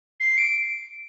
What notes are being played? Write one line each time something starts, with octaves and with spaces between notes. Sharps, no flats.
C7
D7